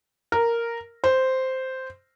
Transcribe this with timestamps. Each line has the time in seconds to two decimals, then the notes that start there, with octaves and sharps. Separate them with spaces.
0.32 A#4
1.04 C5